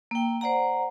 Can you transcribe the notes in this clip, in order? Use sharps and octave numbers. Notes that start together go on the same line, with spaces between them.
A#3 G5
C5 D5 F#5 A#5